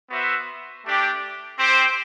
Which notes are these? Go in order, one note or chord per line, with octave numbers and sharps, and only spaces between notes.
B3 F#4 C5 E5
A3 D4 G4
C4 G4 C5